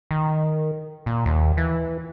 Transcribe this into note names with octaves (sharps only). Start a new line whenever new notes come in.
D#3
A#2
D#2
E3